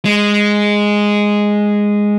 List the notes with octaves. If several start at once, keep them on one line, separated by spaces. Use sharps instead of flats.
G#3